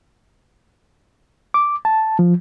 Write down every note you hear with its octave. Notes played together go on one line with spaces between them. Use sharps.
D6
A5
F3